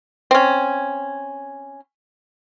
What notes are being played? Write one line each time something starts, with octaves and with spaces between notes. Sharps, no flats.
C4 C#4